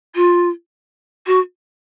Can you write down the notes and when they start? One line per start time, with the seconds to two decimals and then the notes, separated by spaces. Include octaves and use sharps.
0.15 F4
1.27 F#4